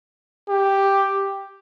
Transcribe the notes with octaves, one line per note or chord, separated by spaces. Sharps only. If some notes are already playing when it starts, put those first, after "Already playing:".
G4